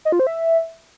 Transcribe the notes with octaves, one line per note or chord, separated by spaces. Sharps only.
D#5
F4
C5
E5